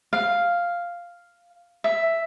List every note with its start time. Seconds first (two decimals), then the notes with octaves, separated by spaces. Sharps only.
0.13 F5
1.84 E5